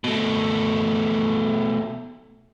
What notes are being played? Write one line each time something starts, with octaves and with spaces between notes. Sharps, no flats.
B2 A3